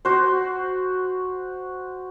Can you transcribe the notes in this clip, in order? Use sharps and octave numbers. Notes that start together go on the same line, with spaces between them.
F#4 C5